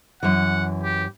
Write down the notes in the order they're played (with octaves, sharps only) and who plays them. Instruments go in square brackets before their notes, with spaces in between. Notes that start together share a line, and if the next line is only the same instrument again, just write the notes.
[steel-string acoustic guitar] F#2 E3 [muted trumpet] F#5
[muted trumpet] G4